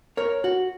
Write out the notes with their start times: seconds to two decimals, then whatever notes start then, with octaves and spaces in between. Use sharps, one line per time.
0.17 A#4 C#5
0.44 F#4